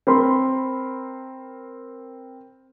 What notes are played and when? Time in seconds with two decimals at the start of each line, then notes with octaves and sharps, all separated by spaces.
0.07 C4 A#4 B5 C6